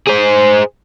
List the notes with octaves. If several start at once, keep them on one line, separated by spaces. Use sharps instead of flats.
G#4 C5